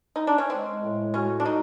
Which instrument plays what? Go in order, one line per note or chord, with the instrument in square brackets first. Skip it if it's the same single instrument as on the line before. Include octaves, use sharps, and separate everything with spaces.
[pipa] D#4
D4
C#4
[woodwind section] G#3 [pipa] C4
[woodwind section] A2
[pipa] C#4 [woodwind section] F#4
[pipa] D4
[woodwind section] G#3 [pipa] D#4